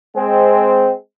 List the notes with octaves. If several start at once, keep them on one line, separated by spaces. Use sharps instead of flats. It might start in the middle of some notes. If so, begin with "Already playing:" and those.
G#3 C4